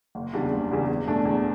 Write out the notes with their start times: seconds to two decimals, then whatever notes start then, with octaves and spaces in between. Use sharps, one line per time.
0.15 F#1
0.33 E2 C#3 G3 D4
0.52 F#1
0.71 E2 C#3 G3 D4
0.89 E2
1.07 B2 A3 D4
1.25 E2